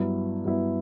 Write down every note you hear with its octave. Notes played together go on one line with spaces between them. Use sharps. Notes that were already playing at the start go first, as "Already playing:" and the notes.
Already playing: G2 F#3 B3 E4
G2 F#3 B3 E4